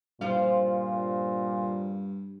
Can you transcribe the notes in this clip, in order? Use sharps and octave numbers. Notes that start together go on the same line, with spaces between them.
G2 A#2 F3 F4